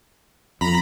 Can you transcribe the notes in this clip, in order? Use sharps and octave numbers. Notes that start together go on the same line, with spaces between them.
F2 A#5 B5